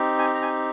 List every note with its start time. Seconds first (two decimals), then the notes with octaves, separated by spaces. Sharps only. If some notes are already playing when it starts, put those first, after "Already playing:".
Already playing: C4 D#4 G4
0.19 G#5
0.35 A#5
0.42 G#5